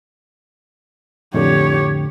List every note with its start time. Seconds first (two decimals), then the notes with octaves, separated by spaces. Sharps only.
1.34 F2 A2 D3 G4 C#5